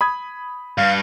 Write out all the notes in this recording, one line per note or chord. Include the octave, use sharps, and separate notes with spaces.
B5 D#6 G#6
G2 F5